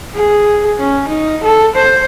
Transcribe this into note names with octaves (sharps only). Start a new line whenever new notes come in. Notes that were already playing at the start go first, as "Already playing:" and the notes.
G#4
C#4
D#4
A4
C5